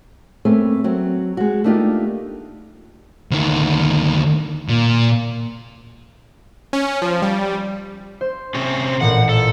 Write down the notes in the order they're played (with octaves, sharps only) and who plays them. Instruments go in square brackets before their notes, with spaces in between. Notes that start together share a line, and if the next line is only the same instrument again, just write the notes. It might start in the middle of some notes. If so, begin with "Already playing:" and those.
[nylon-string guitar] A3 A#3 C4 C#4 B4
F#3 C4
G#3 F#4
A3 A#3 D4 D#4 F4 G4
[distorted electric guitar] D2 D#3
A#2
[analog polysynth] C#4
F3
G3
[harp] C5
[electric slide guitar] C3 C4 C#4
[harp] C6
[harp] A1 A#2 [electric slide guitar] F#5
[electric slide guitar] A4